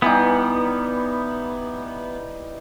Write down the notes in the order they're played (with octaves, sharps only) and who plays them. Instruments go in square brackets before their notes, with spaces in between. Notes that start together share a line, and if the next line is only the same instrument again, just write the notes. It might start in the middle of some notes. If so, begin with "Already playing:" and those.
[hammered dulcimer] E3 G3 D#4 [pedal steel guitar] B3